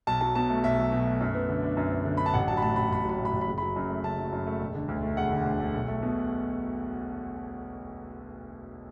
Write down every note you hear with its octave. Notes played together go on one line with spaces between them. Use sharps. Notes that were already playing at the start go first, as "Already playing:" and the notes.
B1 A5
F#3 A5
B2 A5
A3
B1 E5
F#3
B2
A3
F#2
B3
D3
D4
F#2
B3
D3
D4 B5
A5
A1 F#5
F#3 A5
B5
A2 A5
A1 B5
A1 B5
F#3 B5
A2
B5
A1
B5
F#1
F#3 B5
F#2
A3
F#1 A5
F#3
F#2
A3
E1
D3
D2
A3
E1 F#5
D3
D2
A3
B1
A3
B2